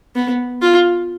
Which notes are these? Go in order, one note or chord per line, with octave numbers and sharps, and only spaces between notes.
B3
F4